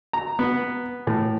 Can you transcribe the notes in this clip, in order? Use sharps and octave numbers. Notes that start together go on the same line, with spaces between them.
A#5
B3
A2